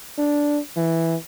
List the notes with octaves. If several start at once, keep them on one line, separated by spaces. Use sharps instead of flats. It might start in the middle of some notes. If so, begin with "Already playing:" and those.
D4
E3